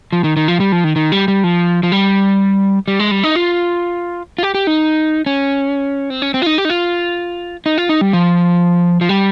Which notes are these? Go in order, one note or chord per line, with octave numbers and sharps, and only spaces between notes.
F3
D#3
D#3
F3
G3
F3
D#3
D#3
G3
G3
F3
F3
G3
G3
G#3
G3
D#4
F4
F4
G4
G4
D#4
C#4
C4
C#4
C4
F4
D#4
G4
D#4
F4
D#4
F4
D#4
G3
F3
F3
G3